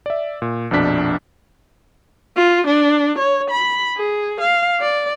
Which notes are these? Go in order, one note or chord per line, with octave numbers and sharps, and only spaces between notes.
D5 E5
A#2
A#1 F2 B2 D4 B6
F4
D4
C#5
B5
G#4
F5
D5